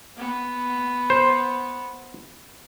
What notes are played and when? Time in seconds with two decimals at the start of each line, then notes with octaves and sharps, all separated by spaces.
0.17 B3
1.10 C5